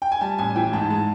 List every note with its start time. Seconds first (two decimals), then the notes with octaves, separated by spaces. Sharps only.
0.02 G5
0.12 G#5
0.21 G3 A5
0.39 A1 G#5
0.56 E3 G5
0.73 G#2 A5
0.90 G#3 A5